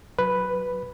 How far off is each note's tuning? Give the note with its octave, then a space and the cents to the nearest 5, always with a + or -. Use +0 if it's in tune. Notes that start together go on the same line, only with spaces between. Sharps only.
F#3 +0 B4 +0 B5 +0